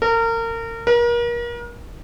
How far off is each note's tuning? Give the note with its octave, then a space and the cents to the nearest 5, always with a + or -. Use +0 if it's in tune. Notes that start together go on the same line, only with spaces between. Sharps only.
A#4 -30
A#4 +35